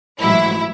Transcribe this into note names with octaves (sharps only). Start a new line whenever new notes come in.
A1 G#2 F#3 E4